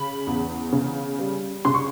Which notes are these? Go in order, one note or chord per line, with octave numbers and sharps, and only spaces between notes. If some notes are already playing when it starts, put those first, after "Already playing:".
Already playing: C#3 B5
E2
C#3
G3
C#3 C6
C#6